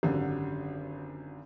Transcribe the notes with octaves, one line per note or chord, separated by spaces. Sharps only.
G#1 F#2 D3 G3